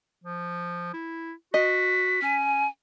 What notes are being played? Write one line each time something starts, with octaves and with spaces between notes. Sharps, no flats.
F3
E4
F#4 D#5 B6
C#4 G#5